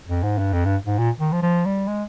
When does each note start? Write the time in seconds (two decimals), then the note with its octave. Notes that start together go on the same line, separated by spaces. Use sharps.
0.09 F2
0.23 G#2
0.38 G2
0.53 F2
0.65 G2
0.86 G#2
0.98 A#2
1.20 D#3
1.32 F3
1.43 F3
1.66 G3
1.88 G#3